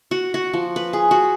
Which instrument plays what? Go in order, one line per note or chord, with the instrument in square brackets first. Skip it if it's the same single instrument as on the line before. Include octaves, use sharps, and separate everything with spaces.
[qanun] F#4
F#4
F3
B4
G#4
F#4